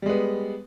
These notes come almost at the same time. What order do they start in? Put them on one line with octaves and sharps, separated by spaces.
G3 G#3 B3